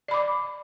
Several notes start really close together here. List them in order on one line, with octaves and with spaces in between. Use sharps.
D5 B5 D6